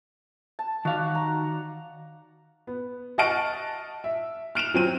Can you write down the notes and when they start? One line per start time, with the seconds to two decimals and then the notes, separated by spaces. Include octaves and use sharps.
0.59 A5
0.85 D#3 F#4 D5 F5
1.15 A#5
2.67 B3
3.18 D#5 F#5 A5 C#6 F6 D7
4.04 E5
4.55 F6 D7 E7 F7
4.74 F#3 C4 D#7